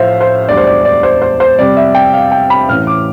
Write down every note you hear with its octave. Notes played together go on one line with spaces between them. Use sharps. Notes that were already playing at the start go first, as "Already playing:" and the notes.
Already playing: A1 A2 F3 A3 C5 E5 F5
C5
E1 D2 D3 G3 D5
C5
D5
D5
C5
C5
C5
F2 C3 G3 D5
E5
G5
F5
G5
B5
A1 A2 E3 F6
D6